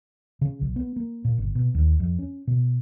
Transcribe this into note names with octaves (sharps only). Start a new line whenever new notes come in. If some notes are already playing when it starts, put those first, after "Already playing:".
C#3
B1
B3
A#3
A#2
G1
B2
D#2
F2
C#4
B2